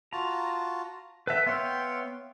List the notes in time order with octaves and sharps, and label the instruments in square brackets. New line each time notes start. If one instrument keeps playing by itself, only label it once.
[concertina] F4 F#4 A5 [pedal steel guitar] A#5
[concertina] A4 F#5 G5 [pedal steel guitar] B4 E5
[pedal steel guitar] B3 C#5 G5 [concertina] E5 F5 C6